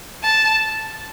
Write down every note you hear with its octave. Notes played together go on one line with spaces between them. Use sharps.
A5